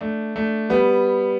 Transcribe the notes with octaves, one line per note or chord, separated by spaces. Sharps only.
A3 D4
A3 D4
G3 B3